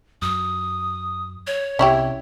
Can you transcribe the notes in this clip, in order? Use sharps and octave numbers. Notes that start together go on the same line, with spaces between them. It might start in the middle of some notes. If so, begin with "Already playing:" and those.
F#2 D#6
C#5
C2 C3 C#4 E4 G4